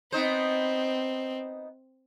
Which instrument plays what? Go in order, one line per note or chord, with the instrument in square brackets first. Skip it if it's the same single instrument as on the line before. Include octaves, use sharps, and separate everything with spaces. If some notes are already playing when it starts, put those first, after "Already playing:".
[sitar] B3 D#4 C5 [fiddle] C4